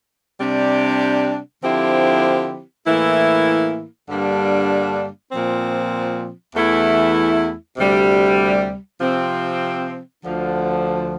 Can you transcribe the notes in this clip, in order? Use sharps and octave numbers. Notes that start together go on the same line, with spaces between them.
C3 G3 D4 G4
D3 F3 C4 E4 G4
A2 E3 A#3 E4
G2 D3 G3 A#3 D4
A#2 F3 C4
E2 E3 A3 E4
D2 C3 G3
C3 F3 C4
D2 D3 F3